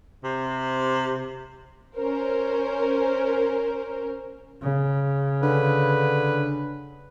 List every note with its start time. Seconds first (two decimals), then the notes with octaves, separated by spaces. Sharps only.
0.24 C3
1.95 C#4 A#4 C5
4.62 C#3
5.43 D3 B4